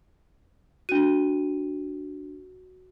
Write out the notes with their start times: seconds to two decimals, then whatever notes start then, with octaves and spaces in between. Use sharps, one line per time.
0.89 D4 F#4 D#7